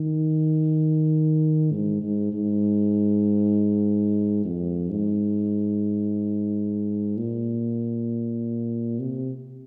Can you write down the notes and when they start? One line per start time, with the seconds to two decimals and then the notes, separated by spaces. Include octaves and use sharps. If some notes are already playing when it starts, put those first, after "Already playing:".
Already playing: D#3
1.72 G#2
2.03 G#2
2.32 G#2
4.45 F2
4.90 G#2
7.17 A#2
8.99 C3